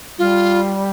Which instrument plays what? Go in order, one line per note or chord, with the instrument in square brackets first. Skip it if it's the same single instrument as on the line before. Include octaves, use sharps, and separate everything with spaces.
[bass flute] G3 [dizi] F4